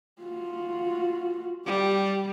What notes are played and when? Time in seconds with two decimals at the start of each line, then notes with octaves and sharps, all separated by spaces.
0.22 F4 F#4
1.66 G3 G4